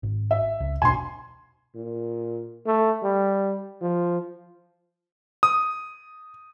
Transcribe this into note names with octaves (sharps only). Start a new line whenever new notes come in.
G#1
E5
C#2
E1 B1 D4 G#5 C6
A#2
A3
G3
F3
D#6